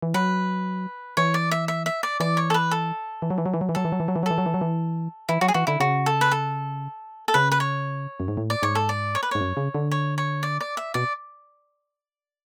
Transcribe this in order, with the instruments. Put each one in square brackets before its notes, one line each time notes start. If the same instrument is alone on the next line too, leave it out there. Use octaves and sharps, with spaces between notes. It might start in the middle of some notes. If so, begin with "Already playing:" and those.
[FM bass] E3
[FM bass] F#3 [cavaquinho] B4
[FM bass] E3 [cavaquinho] C#5
[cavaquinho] D5
E5
E5
E5
D5
[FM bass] E3 [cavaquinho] D5
[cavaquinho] C#5
A4
B4
A4
[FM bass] E3
F#3
E3
F#3
E3
F#3
E3
[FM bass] F#3 [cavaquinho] A4
[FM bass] E3
F#3
E3
F#3
E3
F#3
[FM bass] E3 [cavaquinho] A4
[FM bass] F#3
E3
F#3
E3
[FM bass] E3 [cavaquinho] E4
[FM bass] F#3 [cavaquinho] F#4
[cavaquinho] G#4
[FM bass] E3 [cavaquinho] F#4
[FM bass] D3 [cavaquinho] E4
[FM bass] C#3 [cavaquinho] F#4
[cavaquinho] A4
B4
A4
A4
[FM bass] C#3 [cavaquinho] B4
[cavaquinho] B4
C#5
[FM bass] F#2
G#2
A2
[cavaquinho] D5
[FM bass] G#2 [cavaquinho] C#5
[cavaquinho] A4
D5
C#5
B4
[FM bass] G#2 [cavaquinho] C#5
[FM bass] F#2
C#3
D3
[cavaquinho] C#5
C#5
D5
D5
E5
[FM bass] B2 [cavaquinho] D5